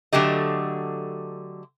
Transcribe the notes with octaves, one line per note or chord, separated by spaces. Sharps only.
D3 F#3 A3 G4 D#5